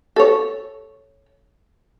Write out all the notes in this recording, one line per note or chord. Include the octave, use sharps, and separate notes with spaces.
A4 C#5